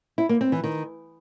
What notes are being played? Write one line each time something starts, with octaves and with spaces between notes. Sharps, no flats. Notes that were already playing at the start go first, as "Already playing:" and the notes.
E4
A#3
C4
E3
D#3